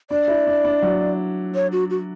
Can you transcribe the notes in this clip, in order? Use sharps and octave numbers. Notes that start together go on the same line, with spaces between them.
D4 D5
E4
D4
D4
F#3
C#5
F#4
F#4